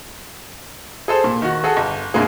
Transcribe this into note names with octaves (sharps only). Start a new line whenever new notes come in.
G#4 A4 C5
A#2
D#3 F#4
F#4 G#4 A4 F#5
G1
C2 G#2 D3 A#3 G#4